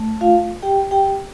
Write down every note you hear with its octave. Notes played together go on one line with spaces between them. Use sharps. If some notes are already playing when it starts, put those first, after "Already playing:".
Already playing: A3
F4 F5
G4 G5
G4 G5